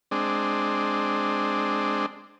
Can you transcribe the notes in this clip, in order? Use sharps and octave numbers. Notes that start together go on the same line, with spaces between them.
G#3 C4 D4